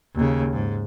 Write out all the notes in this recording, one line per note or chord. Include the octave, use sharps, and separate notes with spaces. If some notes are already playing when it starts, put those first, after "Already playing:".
D#2 C#3
G#2